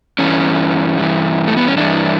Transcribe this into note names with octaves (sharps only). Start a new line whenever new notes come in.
G2 E3 C#4
G2 E3
A3
B3
C#4
G2 E3 D4